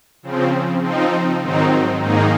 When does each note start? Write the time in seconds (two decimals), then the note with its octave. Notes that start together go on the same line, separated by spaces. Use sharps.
0.23 C#3 F3 C4
0.82 F3 C4 D#4
1.42 G#2 D#3 F#3 C4 D#4
2.00 G#2 D#3 A#3 D#4 G#4